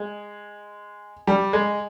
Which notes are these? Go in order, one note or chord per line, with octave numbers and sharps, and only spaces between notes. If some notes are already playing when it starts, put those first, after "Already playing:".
Already playing: G#3
G3
G#3